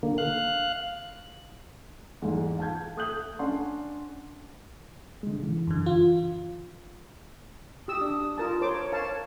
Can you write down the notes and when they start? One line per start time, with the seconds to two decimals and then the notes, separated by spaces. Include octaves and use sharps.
0.03 D3 A#3
0.18 F5 F#6
2.22 E2 G#2
2.58 F5 A5 G6 G#6
2.97 A3 D#6 F#6 G6 F#7
3.39 C#4 D4 D5 F#5 C6
5.23 D3 G#3
5.40 C#3 E3
5.67 F#2 D3
5.86 F4
7.88 G4 D#6 E6
8.01 D4
8.38 F4 A#4 A5
8.61 A#4 C5 C#5 D6
8.92 A#4 F5 A5